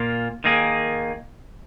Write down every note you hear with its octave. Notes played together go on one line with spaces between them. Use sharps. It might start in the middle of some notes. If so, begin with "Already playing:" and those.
Already playing: A#2 A#3 F4
D#3 A#3 G#4